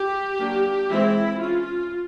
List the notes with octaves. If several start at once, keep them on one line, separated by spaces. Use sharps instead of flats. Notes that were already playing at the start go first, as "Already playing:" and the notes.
Already playing: G4
F#3 A#3 D4
E3 G#3 C4 E4
C#4 F4